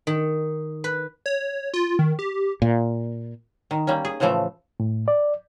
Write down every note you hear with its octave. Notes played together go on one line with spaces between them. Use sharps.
D#3
B4
C#5
F4
D#3
G4
A#2
D#3
G3 A#3 C#4
G#4
A2 C#3 E3 F3 A3
A2
D5